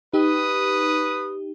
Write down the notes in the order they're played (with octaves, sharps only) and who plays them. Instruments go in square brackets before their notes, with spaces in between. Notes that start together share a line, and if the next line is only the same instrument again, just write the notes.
[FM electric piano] D#4 G4 [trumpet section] B4 D#6